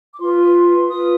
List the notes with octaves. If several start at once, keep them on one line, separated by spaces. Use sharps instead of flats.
D6
F4 B4 C6
F4 B4 D#6